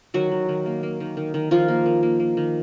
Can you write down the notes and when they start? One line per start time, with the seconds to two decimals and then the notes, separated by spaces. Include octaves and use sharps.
0.14 D#3 F#3 F#4
0.32 D#3
0.49 D#3
0.66 A#3
0.83 A#3
1.00 D#3
1.17 D#3
1.34 D#3
1.51 D#3 F3 F4
1.68 A#3
1.86 D#3
2.03 A#3
2.20 A#3
2.37 D#3